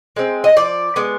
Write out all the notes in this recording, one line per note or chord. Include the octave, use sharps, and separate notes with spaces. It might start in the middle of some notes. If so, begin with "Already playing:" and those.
G#3 C4
D#5
F3 D5
G#3 B3